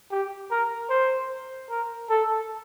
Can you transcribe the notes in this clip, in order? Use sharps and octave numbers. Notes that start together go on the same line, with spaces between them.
G4
A#4
C5
A#4
A4